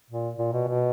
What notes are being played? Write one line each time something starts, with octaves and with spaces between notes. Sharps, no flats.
A#2
A#2
B2
B2